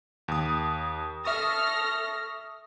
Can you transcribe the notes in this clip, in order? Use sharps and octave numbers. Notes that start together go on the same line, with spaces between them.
D#2 D#6
A4 E5 C#6 D#6 F6 A#6